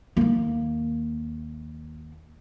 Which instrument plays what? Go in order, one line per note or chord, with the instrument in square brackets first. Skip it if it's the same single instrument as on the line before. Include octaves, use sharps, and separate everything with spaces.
[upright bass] D#2 A#3